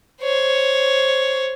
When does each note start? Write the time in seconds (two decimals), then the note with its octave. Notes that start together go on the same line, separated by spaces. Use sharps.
0.21 C5 C#5